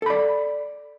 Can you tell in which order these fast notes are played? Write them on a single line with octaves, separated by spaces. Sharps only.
A4 B5 D5